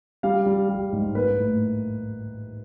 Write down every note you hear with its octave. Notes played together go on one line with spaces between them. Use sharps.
G3 F5
G3
G3
G#2
A#3 B4
A2